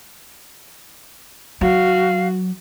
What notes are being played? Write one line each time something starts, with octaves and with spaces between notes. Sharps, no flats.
F#3 F#4 F5